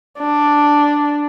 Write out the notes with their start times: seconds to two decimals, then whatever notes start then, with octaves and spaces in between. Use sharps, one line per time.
0.19 D4